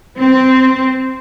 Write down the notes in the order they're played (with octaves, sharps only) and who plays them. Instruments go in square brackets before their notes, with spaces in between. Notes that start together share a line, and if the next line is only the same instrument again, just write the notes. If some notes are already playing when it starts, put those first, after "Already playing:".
[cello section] C4